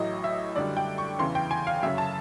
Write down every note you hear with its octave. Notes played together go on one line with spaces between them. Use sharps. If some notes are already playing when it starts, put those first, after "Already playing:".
Already playing: A1 A2 F#3 D#5
E5
F#2 D3 G3 D5
G5
C#6
E2 C#3 E3 C6
G5
G#5
F5
F#2 C#3 F#3 E5
A5